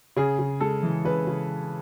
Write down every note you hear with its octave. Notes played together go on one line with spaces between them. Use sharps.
C#3 G#4
C#3
G#3 A4
E3
C#3 B4
C#3